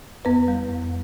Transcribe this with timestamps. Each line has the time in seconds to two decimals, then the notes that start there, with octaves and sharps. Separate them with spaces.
0.25 F2 B3 B4
0.48 G3
0.69 F2